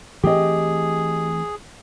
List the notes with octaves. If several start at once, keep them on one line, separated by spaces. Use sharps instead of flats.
E3 A3 C4 G4 G#4 D#5